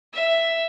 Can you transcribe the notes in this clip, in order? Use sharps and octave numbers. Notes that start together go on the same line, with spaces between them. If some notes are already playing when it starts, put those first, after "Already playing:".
E5